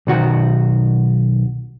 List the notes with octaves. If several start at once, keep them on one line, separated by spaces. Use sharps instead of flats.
B1 D#3 F#4